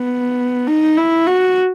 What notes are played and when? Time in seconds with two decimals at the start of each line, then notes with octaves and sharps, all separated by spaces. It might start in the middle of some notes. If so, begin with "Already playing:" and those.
Already playing: B3
0.67 D#4
0.97 E4
1.27 F#4